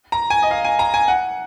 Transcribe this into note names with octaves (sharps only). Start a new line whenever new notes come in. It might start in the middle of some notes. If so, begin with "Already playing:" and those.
A#5
G#5
D#5
F5
G#5
A#5
G#5
F#5